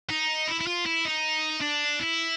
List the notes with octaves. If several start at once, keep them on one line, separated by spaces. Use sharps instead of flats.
D#4
E4
E4
F4
E4
D#4
D4
E4